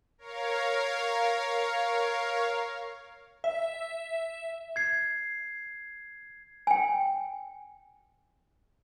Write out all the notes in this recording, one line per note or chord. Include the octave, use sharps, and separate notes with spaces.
A#4 C#5 F5
E5
G#6 C7
G5 G#5